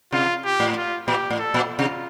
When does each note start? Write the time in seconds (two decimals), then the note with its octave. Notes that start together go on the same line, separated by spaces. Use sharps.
0.12 C3 F4
0.45 G4
0.60 A2
0.76 F4
1.07 A#2 G4
1.30 A2
1.39 A4
1.54 A#2
1.70 F4
1.79 C3